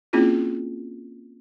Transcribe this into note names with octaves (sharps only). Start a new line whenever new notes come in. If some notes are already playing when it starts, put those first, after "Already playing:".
A#3 C4 C#4 E4 F4 G#4